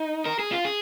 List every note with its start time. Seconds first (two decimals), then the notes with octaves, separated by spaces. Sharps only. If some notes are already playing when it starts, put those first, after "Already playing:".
Already playing: D#4
0.25 A#4
0.39 G#4
0.51 F4
0.65 G#4